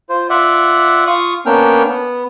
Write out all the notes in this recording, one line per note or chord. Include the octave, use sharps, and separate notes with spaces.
F4 C5
F4 D5 E5 F#5
F4 F5 C#6 D#6
A#3 B3 C#4 D4 G5 F6
B3